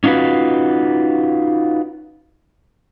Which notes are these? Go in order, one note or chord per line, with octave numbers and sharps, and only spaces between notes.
C#4 D#4 F4 F#4 B4